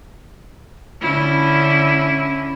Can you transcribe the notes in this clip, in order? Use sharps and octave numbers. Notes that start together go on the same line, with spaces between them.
D3 C#4 E4